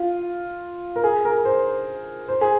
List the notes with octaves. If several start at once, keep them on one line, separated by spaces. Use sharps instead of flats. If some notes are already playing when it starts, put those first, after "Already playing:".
Already playing: F4
A#4
G#4
A#4
C5
C5
G#4